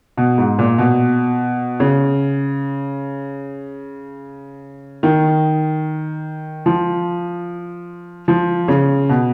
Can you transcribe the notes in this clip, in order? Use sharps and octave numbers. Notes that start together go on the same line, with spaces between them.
B2
G#2
A#2
B2
C#3
D#3
F3
F3
C#3
B2